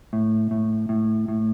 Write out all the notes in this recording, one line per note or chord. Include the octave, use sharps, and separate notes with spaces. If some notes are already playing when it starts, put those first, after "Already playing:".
A2
A2
A2
A2